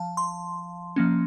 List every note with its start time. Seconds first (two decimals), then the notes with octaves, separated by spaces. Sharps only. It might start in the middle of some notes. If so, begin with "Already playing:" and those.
Already playing: F3 F5 A5
0.17 C6
0.96 F3 A#3 C#4